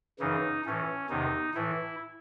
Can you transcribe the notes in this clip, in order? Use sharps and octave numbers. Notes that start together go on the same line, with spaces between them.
F#2 C#3 E3 D#4
A2 E3 C#4
E2 C3 D#3 D#4
A2 E3 E4